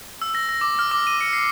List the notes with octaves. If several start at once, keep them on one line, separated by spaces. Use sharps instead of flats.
E6
A#6
A#6
D6
F6
D6
D#7
C#7
C7